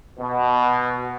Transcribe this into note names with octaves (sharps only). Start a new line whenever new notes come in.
B2